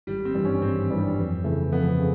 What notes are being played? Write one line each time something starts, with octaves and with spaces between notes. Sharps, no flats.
G#1 G3
C4
G2 E3 G3
C#4
G#1 C4
G2 E3 G3
F2
C#3 E3 A3
F2 B3
C#3